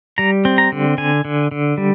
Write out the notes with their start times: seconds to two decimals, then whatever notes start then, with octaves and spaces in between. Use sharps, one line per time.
0.18 G3 A#5
0.45 C4
0.58 A#5
0.72 D3
0.98 D3 G#5
1.25 D3
1.51 D3
1.78 G3